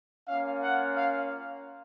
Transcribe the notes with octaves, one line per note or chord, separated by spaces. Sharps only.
A#3 C#4 F4 F5
F#5
F5